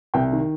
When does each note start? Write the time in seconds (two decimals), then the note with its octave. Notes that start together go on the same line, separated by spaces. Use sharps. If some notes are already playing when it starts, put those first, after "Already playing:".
0.14 C2 G5
0.33 D#3